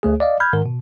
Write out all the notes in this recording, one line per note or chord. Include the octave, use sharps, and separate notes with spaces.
D2 A3 G#4
D5 D#5 F5
B5 F6 G6 G#6
G#2 D#3 A#4
B2